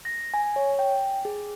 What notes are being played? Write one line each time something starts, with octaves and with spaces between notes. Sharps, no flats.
A#6
G#5
C#5
G5
G#4